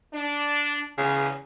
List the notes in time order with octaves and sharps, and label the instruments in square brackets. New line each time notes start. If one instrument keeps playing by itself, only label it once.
[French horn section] D4
[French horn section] E2 [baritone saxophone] C#3